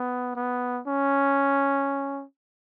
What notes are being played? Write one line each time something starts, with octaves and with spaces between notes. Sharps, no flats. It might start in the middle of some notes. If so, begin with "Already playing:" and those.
Already playing: B3
B3
C#4